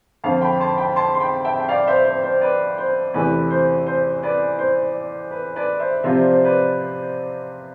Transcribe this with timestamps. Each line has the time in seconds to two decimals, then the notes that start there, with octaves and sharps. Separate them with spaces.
0.24 F2 D3 F3 F5 A5
0.41 G5 B5
0.60 A5 C6
0.78 G5 B5
0.96 A5 C6
1.15 C6
1.20 G5 B5
1.45 E5 G5
1.60 G5
1.69 D5 F5
1.87 C5 E5
2.05 C5
2.24 C5
2.41 B4 D5
2.78 C5
3.14 E2 C3 E3 A3 B4
3.51 C5
3.86 C5
4.23 B4 D5
4.59 C5
5.31 B4
5.56 B4 D5
5.80 C5 E5
6.04 C3 F3 C4 F4 E5
6.18 D5
6.32 C5
6.44 B4 D5